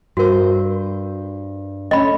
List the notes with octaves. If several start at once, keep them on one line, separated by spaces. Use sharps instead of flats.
G2 F#4 A#4 C5
A3 C#4 D#5 B5